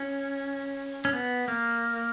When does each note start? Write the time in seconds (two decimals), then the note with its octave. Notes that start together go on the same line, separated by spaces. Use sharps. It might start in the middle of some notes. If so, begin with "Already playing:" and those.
Already playing: C#4
1.05 C#4
1.13 B3
1.48 A#3